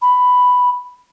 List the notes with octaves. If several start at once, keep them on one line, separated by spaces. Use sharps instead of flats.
B5